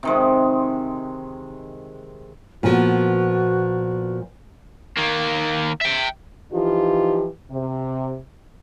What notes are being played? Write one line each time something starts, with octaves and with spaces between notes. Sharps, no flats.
C3 D#3 G#3
A#2 F3 B3 F#4
D#3 A#3
E5 G5
E3 F3 D#4 F4 G4
C3